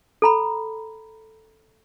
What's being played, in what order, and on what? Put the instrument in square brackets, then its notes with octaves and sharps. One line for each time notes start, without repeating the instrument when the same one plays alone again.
[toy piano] A4 A#5 B5